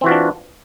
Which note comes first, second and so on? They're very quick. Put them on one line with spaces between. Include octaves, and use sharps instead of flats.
C4 E3 F#4 F4 D4